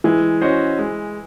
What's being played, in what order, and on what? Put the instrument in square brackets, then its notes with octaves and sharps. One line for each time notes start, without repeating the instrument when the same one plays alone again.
[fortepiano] E3 [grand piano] G#3
[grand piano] C#4 F#4 C5 D#5
G#3